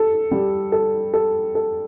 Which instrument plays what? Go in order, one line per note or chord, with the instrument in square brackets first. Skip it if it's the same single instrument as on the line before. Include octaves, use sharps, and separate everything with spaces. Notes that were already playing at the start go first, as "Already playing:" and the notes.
Already playing: [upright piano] A4
G3
A4
A4
A4